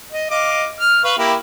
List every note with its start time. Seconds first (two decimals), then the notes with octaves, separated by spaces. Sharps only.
0.12 D#5
0.30 D#5 F5 D6
0.80 F6
1.04 B4 F5 C#6
1.18 A#3 E4 G4